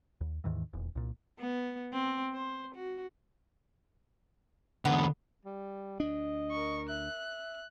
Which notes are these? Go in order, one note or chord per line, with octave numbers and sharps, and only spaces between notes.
D#2
D#2 G#2 D#3 E3
D#1 E2
C2 A#2
B3
C4
C5
F#4
E2 D3 B3
G3
D2 D4 D#5
A#4 C#6
E5 F#6